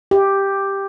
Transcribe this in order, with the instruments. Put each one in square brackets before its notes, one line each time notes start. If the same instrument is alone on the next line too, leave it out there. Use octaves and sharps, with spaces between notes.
[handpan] G4